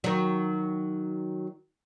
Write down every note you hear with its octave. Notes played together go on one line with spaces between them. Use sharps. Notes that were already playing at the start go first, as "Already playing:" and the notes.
D#3 F#3